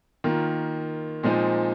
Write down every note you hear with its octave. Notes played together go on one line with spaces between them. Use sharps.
D#3 A#3 F4
A#2 F3 G#3 C4 D#4